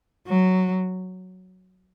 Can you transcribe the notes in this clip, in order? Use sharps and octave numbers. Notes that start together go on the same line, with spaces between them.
F#3